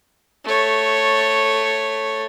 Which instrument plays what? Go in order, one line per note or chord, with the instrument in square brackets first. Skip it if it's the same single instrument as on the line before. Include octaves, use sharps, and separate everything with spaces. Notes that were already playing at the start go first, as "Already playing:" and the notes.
[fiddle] A3 C#5